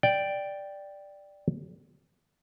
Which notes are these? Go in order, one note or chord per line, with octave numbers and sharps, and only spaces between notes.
D5 G5